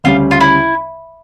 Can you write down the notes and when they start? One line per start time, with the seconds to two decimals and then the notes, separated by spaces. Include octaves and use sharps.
0.04 D2 C#3 G3 C#4 F4
0.31 F4
0.40 E4